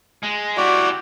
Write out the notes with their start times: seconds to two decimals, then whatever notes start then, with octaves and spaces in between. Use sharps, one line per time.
0.23 G#3
0.57 E4 F#4 G4 D5